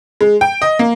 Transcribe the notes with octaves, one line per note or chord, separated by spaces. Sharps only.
G#3
G5
D#5
A#3